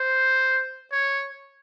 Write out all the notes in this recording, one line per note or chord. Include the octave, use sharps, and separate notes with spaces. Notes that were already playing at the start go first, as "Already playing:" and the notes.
Already playing: C5
C#5